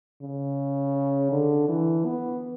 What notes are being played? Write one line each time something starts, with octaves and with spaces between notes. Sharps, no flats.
C#3
D3
E3
B3